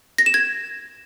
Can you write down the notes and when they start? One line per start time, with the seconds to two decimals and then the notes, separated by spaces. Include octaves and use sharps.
0.18 A#6
0.26 E7
0.34 G#6